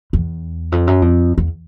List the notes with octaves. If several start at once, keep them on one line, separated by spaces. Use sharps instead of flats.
E2
F2
F#2
F2
E2